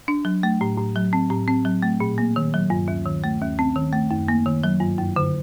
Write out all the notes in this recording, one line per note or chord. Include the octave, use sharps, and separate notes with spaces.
D4
F#3
A3
A2
A2
F#3
C4
A2
C4
F#3
A3
A#2
A#3
D#3
F#3
G2
D#2
D#3
A3
D#2
C4
D#3
A3
F#2
A#3
D#3
F#3
G2
F#2
D3